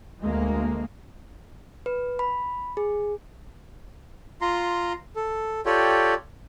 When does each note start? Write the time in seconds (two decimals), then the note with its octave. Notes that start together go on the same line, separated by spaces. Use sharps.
0.21 D2 G#3 A#3
1.86 B4
2.19 B5
2.77 G#4
4.41 F4 A#5 C6
5.16 A4
5.66 F4 G4 A4 C#5 D5 G5